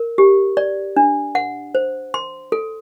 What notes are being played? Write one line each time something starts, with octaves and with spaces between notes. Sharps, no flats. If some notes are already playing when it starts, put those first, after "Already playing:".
Already playing: A#4
G4
D5
D4
F#5
C5
C6
A4